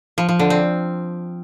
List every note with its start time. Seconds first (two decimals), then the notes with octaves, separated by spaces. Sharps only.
0.18 F3
0.29 F3
0.39 D3
0.50 C4